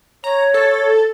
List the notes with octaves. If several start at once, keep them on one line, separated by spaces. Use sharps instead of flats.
C#5 A#5
A4